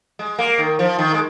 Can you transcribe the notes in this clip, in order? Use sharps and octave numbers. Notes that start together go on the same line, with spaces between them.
G#3
A#3
D#3
F3
D#3
G#3